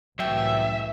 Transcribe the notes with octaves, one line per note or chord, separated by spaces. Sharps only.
C2 F#2 A2 E3 E5 G5